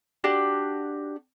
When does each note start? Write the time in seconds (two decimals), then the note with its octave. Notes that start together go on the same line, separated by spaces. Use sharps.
0.24 D4 F#4 G4